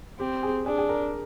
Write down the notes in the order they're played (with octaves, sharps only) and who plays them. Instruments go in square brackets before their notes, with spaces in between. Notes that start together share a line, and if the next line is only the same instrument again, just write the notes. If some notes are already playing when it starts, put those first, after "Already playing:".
[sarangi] C4 [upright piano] G4
[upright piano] G#4
[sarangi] D4 [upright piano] G#4
[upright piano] G#4
A#4